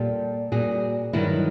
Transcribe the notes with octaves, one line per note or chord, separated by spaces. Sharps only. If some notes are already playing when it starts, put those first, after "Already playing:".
Already playing: A#2 G3 G4 A4
A#2 G3 F#4 G#4
G2 D#3 F#3 E4 F#4